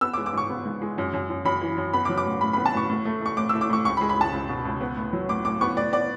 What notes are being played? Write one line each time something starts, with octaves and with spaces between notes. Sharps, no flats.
B3 E6
D6
G#3
D6
G#2 C#6
B3
G#2
G#3
F#2
F#2
F#2
F#2 B5
E3
F#2
B3 B5
D6
F#3
D6
A2
A2 B5
B3 B5
A5
A2 C#6
A2
A3
A3 C#6
A2 D6
A3 E6
D6
A2 C#6
C#2 C#6
B5
G#3
B5
C#2 A5
C#2
B2
C#2
B3
A2
F#3
A2 D6
A2 D6
B3 C#6
A2 D5
B3 D5